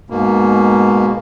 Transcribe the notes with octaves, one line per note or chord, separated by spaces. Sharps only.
G#2 B2 A#3